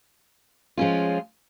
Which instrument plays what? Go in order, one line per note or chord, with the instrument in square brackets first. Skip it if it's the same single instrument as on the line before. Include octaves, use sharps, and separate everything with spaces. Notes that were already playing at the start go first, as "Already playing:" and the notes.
[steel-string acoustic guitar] F3 G#3 C#4 F4